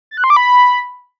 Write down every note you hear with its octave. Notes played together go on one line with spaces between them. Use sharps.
A6
F#6
C6
D6
B5